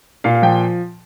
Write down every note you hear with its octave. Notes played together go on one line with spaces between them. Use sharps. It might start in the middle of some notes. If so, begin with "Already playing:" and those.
A#2 F5
F5
F3 G5